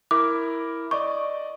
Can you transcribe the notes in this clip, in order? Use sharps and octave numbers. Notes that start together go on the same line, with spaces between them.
E4 A#4 D6
D5 D#5 C#6 D6